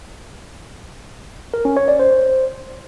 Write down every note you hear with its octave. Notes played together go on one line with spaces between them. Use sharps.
A#4
C#4
C#5
D5
C5